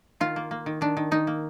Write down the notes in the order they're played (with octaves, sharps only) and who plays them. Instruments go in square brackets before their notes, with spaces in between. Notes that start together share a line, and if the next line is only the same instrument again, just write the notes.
[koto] D#3 F4
A#3
A#3
D#3
D#3 D4
D#3
D#3 D#4
A#3